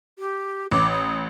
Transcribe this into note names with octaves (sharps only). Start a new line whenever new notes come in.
G4
A1 D6
D#6